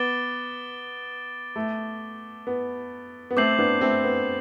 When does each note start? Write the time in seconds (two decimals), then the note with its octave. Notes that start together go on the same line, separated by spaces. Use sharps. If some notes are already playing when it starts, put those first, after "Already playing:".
Already playing: B3 D6 A6 D7 G7
1.56 A3
2.47 B3
3.31 B3
3.37 A3 C4 D6 G6 C7 F#7
3.59 B3 D4
3.81 A3 C4
4.04 B3